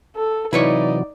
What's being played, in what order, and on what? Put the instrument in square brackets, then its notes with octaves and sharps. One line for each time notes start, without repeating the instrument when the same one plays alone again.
[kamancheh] A4
[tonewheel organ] C3 E3 F#3 [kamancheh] D#4 D5 [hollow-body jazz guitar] E4 B4 C#5